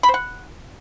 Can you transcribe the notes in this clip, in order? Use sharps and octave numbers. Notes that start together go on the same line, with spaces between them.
B5
C5
F#5